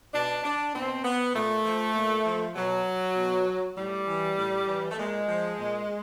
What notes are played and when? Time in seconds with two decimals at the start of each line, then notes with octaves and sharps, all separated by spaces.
0.13 B2 D4
0.44 D4
0.75 B2 C4
1.04 B3
1.35 A#2 A3
1.65 F3
1.95 A#2
2.25 F3
2.56 B2 F#3
3.17 B2
3.77 A2 G3
4.07 E3
4.38 A2
4.68 E3
4.91 A3
4.98 A#2 G#3
5.28 F3
5.59 A#2